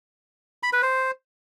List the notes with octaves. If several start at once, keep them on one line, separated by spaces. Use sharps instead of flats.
B5
B4
C5